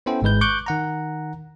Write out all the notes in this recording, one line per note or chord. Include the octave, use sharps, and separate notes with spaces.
B3 C#4 E4 A4 C5 G5
G#1 G#2 G#3 B4 G6
C#6 D6 F#6 G6
D#3 F#5 A#5